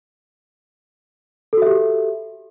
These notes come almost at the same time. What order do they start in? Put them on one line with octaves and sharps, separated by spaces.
A4 F#4 E5 G4